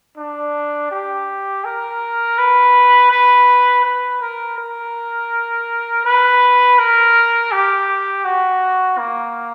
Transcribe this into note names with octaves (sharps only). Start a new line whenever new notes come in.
D4
G4
A#4
B4
B4
B4
A#4
A#4
B4
A#4
G4
F#4
A#3